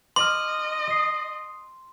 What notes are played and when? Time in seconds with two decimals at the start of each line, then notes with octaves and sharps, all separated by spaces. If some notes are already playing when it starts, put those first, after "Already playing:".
0.16 D#5 C6 D6 F6
0.88 D#6 C7